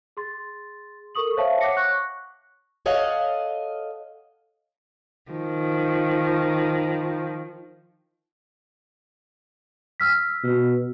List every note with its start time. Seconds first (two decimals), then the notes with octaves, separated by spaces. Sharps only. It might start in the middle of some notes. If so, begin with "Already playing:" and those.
0.17 G#4 C6 A6
1.15 A4 A#4 C#6 D#6 F#7
1.37 C5 C#5 E5 F5 A5
1.60 C#5 F#5 D6 A#6 C#7
1.77 C#6 F#6 A#6
2.86 A4 C#5 D#5 F5 F#5
5.29 D#3 F3
10.00 E6 F6 B6
10.44 B2